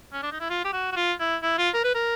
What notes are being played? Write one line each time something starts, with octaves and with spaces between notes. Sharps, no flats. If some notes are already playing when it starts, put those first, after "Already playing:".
C#4
D4
D#4
E4
F4
G4
F#4
F#4
F4
E4
E4
F4
A#4
B4
A#4